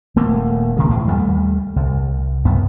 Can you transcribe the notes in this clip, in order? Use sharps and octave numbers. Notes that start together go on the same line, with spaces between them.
D#1 A3 A#3
C2 C3 D#3 G#3
E2 A2
D#2 G3 A3
C2
C2 F#2 B3